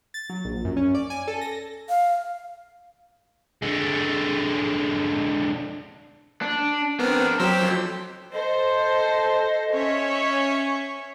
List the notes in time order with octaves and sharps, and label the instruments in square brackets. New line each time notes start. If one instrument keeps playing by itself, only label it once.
[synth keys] A6
F#3
A#1
F#2
C#4
D5
G#5
A4
A#6
[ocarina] F5
[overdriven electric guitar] D3 G#3
D4
[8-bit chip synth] B3 C4 [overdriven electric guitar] D4 A#4
[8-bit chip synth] F#3 C5 E6 [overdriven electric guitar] G4 A#4
[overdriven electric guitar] F2
[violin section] A4 C5 [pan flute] D#5
[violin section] C#4 C#5 E5